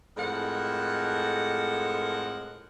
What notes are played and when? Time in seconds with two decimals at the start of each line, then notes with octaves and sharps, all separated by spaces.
0.17 F2 A2 G#3 A#4 F#5